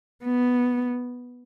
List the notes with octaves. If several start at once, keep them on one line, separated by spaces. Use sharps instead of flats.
B3